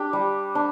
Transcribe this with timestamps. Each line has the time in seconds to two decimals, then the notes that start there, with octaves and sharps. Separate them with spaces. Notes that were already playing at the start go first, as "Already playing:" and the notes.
Already playing: D4 G4
0.13 G3
0.55 D4